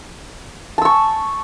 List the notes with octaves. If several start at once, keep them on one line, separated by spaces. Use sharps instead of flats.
A5 C#6 E6